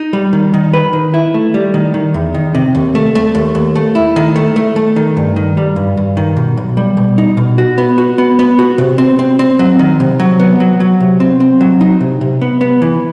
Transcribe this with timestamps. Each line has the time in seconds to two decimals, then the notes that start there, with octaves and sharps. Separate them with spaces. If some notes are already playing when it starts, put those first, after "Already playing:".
Already playing: D#4
0.13 G3
0.33 D#3
0.54 D#3
0.73 B4
0.93 D#3
1.14 E4
1.34 A3
1.54 G3
1.74 D#3
1.94 D#3
2.14 E2
2.34 D#3
2.55 C3
2.75 D#2
2.95 A3
3.15 A3
3.35 D#2
3.55 D#2
3.75 A3
3.95 E4
4.16 D#3
4.36 A3
4.56 A3
4.76 A3
4.96 D#3
5.17 G2
5.36 D#3
5.57 G3
5.76 G2
5.97 G2
6.17 D#3
6.37 B2
6.57 B1
6.77 G3
6.97 B2
7.18 D#4
7.37 B2
7.58 F#4
7.78 B3
7.98 F#4
8.18 B3
8.39 B3
8.59 F#4
8.78 C3
8.98 C4
9.19 C4
9.39 C4
9.59 F#3
9.79 D#3
10.00 C3
10.20 F#3
10.39 B3
10.60 F#3
10.80 F#3
11.00 C3
11.20 C4
11.40 C4
11.61 F#3
11.81 D#4
12.01 C3
12.21 C3
12.41 B3
12.61 B3
12.82 E3